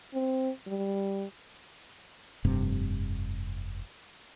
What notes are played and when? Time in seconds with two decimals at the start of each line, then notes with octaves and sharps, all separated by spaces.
0.14 C4
0.68 G3
2.44 F1 G2 C3